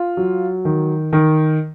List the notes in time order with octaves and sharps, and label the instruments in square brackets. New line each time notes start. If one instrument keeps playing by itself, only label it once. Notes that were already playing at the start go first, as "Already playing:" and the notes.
Already playing: [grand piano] F4
F#3
D#3
D#3